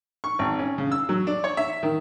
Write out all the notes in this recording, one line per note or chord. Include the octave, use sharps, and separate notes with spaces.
C#6
G#1
C#4
C#3
E6
F#3
D4
C#5
E5
D#3